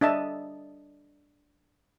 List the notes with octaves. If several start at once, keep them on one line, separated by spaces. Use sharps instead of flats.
D4 D#5 E5 A5